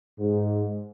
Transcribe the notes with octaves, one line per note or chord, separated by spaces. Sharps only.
G#2